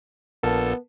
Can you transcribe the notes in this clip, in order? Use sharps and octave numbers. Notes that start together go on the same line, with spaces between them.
A#1 A#2 B3 A4 A#4 A5